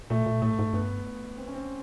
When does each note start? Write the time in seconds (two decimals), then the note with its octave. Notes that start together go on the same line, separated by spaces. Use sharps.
0.10 A#2 A3
0.26 A#2
0.42 A2 A3
0.59 G#2
0.73 G2 B3
1.37 C4
1.47 C#4
1.53 C4